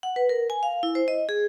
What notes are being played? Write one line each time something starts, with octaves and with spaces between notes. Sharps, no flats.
F#5
B4
A#4
G#5
F5
E4
C5
D#5
G#4